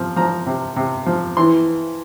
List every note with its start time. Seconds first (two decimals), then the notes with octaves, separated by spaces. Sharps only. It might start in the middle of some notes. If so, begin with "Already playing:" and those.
Already playing: C3 F3
0.16 F3 A#5
0.46 C3
0.76 C3
1.06 F3
1.37 E3 C6